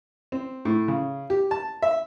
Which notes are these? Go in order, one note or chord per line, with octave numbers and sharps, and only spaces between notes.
C4
A2
C#3
G4
A5
E5